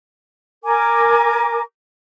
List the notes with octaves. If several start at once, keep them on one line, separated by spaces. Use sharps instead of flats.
A#4 G#5 D6